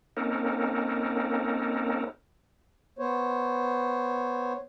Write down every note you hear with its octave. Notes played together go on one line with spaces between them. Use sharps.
A#3 C4 C#4 D#4 A4 A#4
B3 C5 C#5